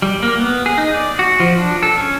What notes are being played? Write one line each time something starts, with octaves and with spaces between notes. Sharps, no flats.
G3
A#3
B3
G#4
D#4
D5
F#4
F3
D4
A4
C#4